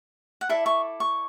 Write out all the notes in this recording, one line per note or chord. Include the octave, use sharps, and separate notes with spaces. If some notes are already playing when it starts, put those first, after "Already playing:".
F#5
E4 A4 D5 E5
C#6
C#6